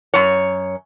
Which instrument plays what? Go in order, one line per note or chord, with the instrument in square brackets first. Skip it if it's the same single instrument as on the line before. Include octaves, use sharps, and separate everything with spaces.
[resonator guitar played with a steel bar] F#2 C#5